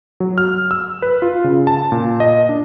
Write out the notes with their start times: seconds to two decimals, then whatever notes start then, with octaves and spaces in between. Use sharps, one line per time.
0.20 F#3
0.38 F6
0.71 E6
1.02 B4
1.22 F4
1.44 C#3
1.67 A5
1.92 A#2
2.20 D#5
2.49 D4